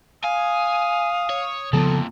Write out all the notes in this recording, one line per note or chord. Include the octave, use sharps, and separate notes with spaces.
F5 G#5 D#6
C#5
F2 A#2 C#3 F3 B3 A4